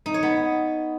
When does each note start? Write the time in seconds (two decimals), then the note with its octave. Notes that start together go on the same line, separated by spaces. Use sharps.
0.06 D#4
0.14 C#5
0.23 B3